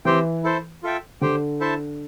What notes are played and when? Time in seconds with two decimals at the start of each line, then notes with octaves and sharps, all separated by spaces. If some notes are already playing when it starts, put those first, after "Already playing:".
0.05 E3 C4 G4 C5 G5
0.44 E4 A4 C5
0.83 F4 A4 E5 G5
1.21 D3 G4 C5 G5
1.61 E4 A4 C5 E5 A5